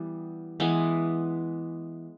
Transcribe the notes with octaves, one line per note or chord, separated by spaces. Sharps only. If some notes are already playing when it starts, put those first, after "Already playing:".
Already playing: E3 G3 B3
E3 G#3 B3